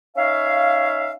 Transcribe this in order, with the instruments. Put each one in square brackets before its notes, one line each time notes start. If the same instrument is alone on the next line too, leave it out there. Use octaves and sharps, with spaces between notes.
[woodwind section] C#4 D#4 C#5 E5 F5